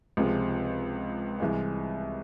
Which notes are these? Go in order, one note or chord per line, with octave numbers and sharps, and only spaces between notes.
C#2 C3 F3 G#3
C2 C3 E3 G#3